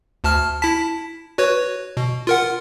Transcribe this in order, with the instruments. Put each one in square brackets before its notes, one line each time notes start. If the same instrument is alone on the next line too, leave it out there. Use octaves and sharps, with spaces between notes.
[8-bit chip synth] D2 A5 F6
E4 A5 B6
F#4 B4 C#5
B2
F4 A#4 F#5